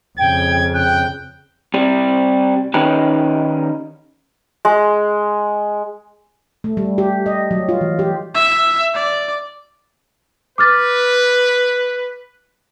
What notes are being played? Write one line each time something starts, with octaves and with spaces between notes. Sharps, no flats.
F2 C#3 G5 G#6
G5 F#6
C3 G3
D#3 C#4 D#4 G4 B4
G#3
A3
G3
G4
D#5
F#3
F4
E3
G4
E5
D5
B4 D6 F6 A6